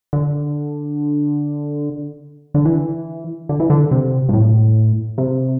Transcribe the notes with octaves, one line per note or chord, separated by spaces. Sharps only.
D3
D3
E3
D3
E3
D3
C3
G2
A2
C3